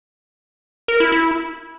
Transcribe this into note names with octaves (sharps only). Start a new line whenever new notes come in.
A#4
E4
E4